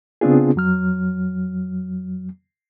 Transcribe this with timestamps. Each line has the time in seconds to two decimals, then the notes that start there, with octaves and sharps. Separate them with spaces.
0.21 C#3 B3 C4 D4 F4 G#4
0.56 F2 F#3 F6